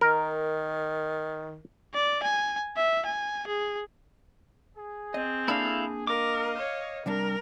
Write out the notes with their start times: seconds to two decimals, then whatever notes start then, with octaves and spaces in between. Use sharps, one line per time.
0.01 D#3 A#4
1.94 D5
2.23 G#5
2.76 E5
3.06 G#5
3.47 G#4
4.77 G#4
5.14 C4 D#5
5.48 A#3 D4 E4 A4 F5
6.07 A#4 D#5 F5 D6
6.58 C#5
7.06 C3 G3 D4 A#4